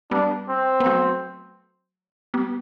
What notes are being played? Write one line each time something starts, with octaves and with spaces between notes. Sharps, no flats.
G3 B3 D4
C4
B3
F#3 A3
G3 B3